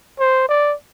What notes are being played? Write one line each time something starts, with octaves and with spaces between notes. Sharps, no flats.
C5
D5